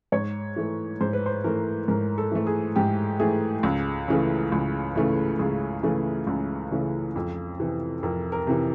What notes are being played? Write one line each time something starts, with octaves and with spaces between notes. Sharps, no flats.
G#2 C#5
E3 A3
G#2 C5
B4
C5
E3 A3 A#4
G#2 A#4
A4
E3 A3
G#4
G#2 G4
E3 A3 G#4
C#2
C#3 E3 A3
C#2
C#3 E3 A3
C#2 G#4
C#3 E3 A3
C#2
C#3 E3 A3
F2
C3 E3
F2 A#4
A#4
C3 E3